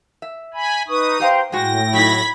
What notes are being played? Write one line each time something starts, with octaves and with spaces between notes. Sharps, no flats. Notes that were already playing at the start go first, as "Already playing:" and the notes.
E5
G#5 B5
D#4 B4 C#6 D#6
G4 C5 F5 G5 A#5
A2 G#3 F#4 G5 A#6
F#3 D#4 B5 G#6 B6